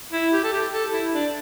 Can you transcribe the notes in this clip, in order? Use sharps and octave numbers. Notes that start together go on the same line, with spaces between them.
E4
G4
A4
G4
A4
E4
D4